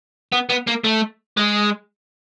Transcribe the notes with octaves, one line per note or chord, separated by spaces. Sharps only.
B3
B3
A#3
A3
G#3